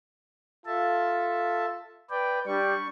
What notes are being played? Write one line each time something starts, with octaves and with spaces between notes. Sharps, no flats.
F4 A4 E5 A5
B4 D5 G5
G3 D4 C#6